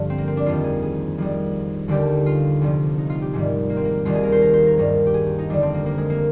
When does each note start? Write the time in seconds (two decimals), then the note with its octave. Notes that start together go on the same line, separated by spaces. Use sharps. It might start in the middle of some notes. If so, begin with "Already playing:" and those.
Already playing: G2 D3 F3
0.10 C4
0.18 A#3
0.27 C4
0.37 D4
0.46 F2 D#3 G3 F4
0.64 G#4
0.82 G#4
1.18 F2 D#3 G3
1.88 D#2 D3 G3 G4
2.26 F4
2.61 C2 C3 F3
2.98 D#4
3.10 F4
3.22 G4
3.33 G#2 D#3 G3 G#3
3.70 A#3
3.77 C4
3.85 A#3
4.05 D#2 D#3 G3 F4
4.15 G#4
4.23 A#4
4.32 C5
4.42 A#4
4.53 C5
4.66 A#4
4.78 G2 D#3 G3 A#4
5.07 G4
5.14 G#4
5.26 G4
5.39 D#4
5.50 F2 D3 G3 D4
5.62 C4
5.74 A#3
5.86 A#3
5.98 G#3
6.10 A#3